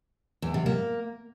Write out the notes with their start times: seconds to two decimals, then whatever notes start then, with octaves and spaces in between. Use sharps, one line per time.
0.42 E2
0.54 C3
0.66 A#3